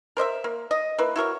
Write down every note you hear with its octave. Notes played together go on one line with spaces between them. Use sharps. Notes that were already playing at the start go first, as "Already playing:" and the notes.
A#4 C5 D#5 E5
A#3
D#5
A#3 E4 B4
E4 F#4 A#4 C#5